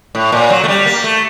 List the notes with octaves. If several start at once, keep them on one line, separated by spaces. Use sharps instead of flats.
A2
A#2
F#3
A3
G3
A#3
A3